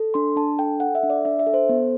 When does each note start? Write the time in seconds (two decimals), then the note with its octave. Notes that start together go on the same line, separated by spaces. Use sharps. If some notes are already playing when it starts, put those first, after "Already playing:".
Already playing: A4
0.14 D4 C6
0.36 D4 A5
0.59 A4 G5
0.80 A4 F#5
0.95 E5
1.03 D4
1.10 D5
1.25 D4 E5
1.39 E5
1.47 A4
1.54 C5
1.69 B3